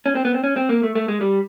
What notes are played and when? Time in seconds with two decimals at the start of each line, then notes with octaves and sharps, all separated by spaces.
0.06 C#4
0.15 C4
0.25 B3
0.34 C4
0.44 C#4
0.56 C4
0.69 A#3
0.83 A3
0.95 A3
1.08 G#3
1.21 G3